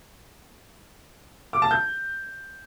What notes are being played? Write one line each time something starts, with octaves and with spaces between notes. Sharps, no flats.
D6
A5
G6